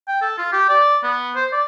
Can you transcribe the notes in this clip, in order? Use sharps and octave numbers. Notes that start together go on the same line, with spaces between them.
G5
A4
F4
G4
D5
B3
C5
D5